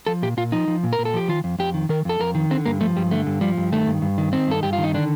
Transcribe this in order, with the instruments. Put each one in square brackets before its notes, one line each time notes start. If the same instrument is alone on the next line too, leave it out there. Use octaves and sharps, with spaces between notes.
[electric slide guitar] F3 A4
A#2 G4
A#2 F4
F3 D#4
F3
A#2
A#4
A#2
A4
F3 G4
D#3 F4
F2
F2 G4
D#3
D#3 A#4
F2 A4
F2 A#4
D#3
D3 C4
G2 A#3
F3 A3
G2 G3
D3 A3
G2
F3 G3
G2
D#3 A3
G2
G2
D#3
D#3 C4
G2 A4
G2 G4
F4
D#3
D#4
D3 D4